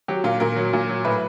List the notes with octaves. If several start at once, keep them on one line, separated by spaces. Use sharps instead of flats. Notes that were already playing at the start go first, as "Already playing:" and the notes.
F#3 G4
A#2 F4
A#2 A#4
F#3
A#2
F#3
A2 B4